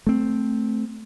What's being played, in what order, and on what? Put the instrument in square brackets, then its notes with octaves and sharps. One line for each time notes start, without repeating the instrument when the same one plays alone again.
[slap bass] A3 C4